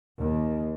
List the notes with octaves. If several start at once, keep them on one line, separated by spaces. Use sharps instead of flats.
D#2